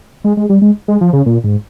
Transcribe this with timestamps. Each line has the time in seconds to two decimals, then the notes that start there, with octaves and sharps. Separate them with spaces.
0.24 G#3
0.37 G#3
0.49 G3
0.62 G#3
0.88 G#3
1.01 F3
1.13 C#3
1.26 A#2
1.44 G#2